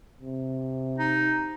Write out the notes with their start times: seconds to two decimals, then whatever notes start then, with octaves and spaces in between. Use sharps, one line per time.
0.21 C3
0.99 D#4